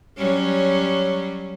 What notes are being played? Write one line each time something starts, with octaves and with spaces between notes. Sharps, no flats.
F#3 G3 C#4